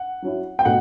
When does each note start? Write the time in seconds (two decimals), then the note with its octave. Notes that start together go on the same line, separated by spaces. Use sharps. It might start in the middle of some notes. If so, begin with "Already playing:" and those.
Already playing: F#5
0.22 F#3 C#4 E4
0.59 G5
0.65 B2 A3 F#5